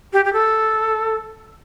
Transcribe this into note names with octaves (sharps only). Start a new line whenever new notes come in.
G4
G4
A4